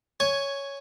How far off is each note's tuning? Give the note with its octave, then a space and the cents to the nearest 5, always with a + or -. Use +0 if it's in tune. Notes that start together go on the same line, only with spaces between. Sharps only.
C#5 +5 G#5 +0